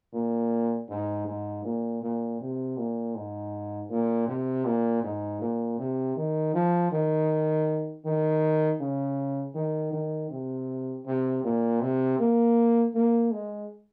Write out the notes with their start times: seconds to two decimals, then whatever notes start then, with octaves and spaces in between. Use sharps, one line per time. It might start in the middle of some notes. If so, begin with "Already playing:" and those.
0.14 A#2
0.90 G#2
1.27 G#2
1.65 A#2
2.02 A#2
2.41 C3
2.78 A#2
3.15 G#2
3.91 A#2
4.28 C3
4.66 A#2
5.03 G#2
5.41 A#2
5.79 C3
6.17 D#3
6.54 F3
6.92 D#3
8.05 D#3
8.80 C#3
9.55 D#3
9.93 D#3
10.31 C3
11.06 C3
11.44 A#2
11.81 C3
12.19 A#3
12.94 A#3
13.32 G#3